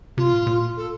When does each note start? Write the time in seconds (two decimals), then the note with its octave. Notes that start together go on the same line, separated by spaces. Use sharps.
0.17 C3 F4
0.33 A2
0.47 A#2
0.77 A4